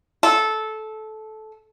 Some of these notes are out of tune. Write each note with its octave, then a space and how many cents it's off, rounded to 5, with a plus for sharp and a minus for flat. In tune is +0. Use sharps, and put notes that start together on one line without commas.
A4 -15